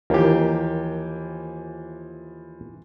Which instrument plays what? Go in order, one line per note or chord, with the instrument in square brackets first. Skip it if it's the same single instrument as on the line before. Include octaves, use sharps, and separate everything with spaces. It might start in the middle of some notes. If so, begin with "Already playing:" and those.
[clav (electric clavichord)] D#2 [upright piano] E3 F3 [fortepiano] A#3 G4